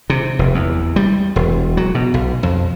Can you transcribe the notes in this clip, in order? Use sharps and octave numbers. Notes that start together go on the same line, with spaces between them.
C3
F1
E2
G3
E1
F#3
B2
B1
F2